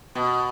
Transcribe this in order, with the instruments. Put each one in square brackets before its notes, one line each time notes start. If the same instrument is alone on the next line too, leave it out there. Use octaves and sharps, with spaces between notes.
[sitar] B2